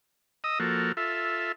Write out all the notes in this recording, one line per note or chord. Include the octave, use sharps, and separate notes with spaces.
D#5 D#6 E6
F3 A#3 F#4 A4
F4 A4 E5